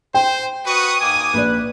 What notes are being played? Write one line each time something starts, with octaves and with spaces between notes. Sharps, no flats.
C5 G5
F#4 B4 C#6 D#6
G#2 A#3 D#5 G#5 D6
A#1 B4 D5